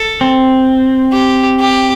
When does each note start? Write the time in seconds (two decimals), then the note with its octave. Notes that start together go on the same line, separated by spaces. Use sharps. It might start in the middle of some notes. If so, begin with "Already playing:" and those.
Already playing: A4
0.21 C4
1.13 G4
1.60 G4